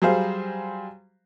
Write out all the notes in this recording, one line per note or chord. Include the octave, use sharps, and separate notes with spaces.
F#3 G3 G#4 C5 F5